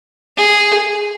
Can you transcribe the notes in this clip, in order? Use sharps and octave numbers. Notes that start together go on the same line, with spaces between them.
G#4